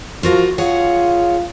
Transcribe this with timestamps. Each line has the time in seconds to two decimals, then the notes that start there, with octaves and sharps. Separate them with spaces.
0.23 F3 F4 F#4 A#4
0.58 F4 G#4 C#5 F#5